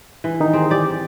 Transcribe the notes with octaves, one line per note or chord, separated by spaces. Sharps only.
E3
D#3 D#4
C4 G#4
G4 D5